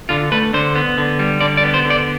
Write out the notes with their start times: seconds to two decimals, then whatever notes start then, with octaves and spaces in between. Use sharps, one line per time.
0.09 D3 F4
0.32 A3 B4
0.53 D3 C5
0.75 B3
0.98 D3
1.19 G3
1.40 D3 D5
1.57 D5
1.64 B3
1.74 C5
1.85 D3
1.90 D5